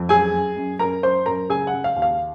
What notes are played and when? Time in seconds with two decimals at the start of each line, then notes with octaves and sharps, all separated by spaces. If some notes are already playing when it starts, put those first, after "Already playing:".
Already playing: F2
0.09 F#2 G#4 G#5
0.34 F#2
0.56 F#2
0.79 F#2 A#4 A#5
1.03 F#2 C5 C6
1.26 F#2 A#4 A#5
1.49 C#3 G#4 G#5
1.67 F#5
1.73 C#3
1.84 F5
1.96 D#2
2.02 F5